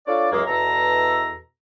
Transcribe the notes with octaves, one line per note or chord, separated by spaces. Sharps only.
D4 F4 A4 C#5 D5
C#2 F#2 G#3 A#3
E2 B2 A4 A#5